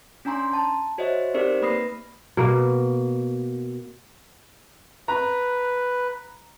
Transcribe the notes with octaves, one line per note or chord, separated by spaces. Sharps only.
C#4 D4 G#5 A#5 C6
A5
F#4 C5 C#5 D#5 E5
C4 D#4 G4 A#4 C5 D5
A#3 B4 B5 D#6 A#6 C7
B2 A#3
B4 A#5